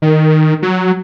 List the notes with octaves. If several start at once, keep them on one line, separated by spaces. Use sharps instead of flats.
D#3
F#3